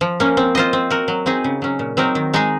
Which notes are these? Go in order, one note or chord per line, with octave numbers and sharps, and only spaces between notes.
F3
A#3 C#4
C4
F4 C5 D#5
C4
F#4 A#4
F#3
C4 D#4 G#4 D#5
C#3
F#3 C#4
A#2
F#3 C4 D#4 A#4
D#3
G#3 D#4 G#4